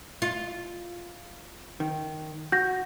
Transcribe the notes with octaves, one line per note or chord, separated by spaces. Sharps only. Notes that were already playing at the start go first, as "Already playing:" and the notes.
F4
D#3
F#4 G6 A#6